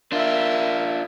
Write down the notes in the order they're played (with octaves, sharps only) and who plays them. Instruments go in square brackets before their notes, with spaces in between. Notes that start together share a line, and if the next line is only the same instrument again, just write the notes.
[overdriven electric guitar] D4 F4 [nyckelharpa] A#4 E5